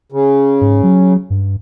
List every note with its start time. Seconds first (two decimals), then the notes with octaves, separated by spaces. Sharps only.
0.12 C#3
0.61 G#2
0.83 F#3
1.30 G2